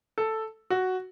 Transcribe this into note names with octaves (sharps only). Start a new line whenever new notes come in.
A4
F#4